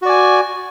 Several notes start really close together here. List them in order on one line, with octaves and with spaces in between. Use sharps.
F#4 D5 G#5